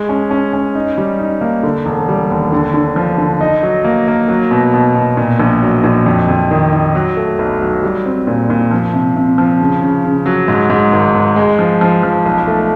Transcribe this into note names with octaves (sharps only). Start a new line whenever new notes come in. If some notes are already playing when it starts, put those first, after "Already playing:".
Already playing: G#3
C#4
C#4
C#4
D#4
G3
D#4
A#3
D3
E1
G3
D#2
D3
D3
F3
D3
D#4
F#3
A#3
A#3
F#3
B2
B2
B2
A#2
A#1
F#3
A#1
F2
F2
D#3
D#3
F#3
A3
B1
F#3
G3
C4
A#2
A#2
F3
C3
C3
F3
C#3
C#3
C#3
F#3
G#2
G#2
G#1
G#1
G#3
F3
F3
F3
B1
A3